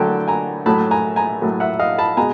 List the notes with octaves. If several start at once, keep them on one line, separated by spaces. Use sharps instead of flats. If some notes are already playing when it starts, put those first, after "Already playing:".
Already playing: D3 F#3 A3 G5 A5
G#5 A#5
A2 F#3 A3 A5 B5
G#5 A#5
G#5 A#5
A2 F#3 A3
E5 F#5
D#5 F5
A5 B5
B2 G#3 G#5 A#5